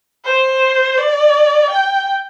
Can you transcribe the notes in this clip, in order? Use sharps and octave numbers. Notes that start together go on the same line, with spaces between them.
C5
D5
G5